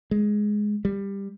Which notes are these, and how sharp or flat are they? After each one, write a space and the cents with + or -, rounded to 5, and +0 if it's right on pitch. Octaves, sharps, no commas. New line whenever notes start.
G#3 +5
G3 +15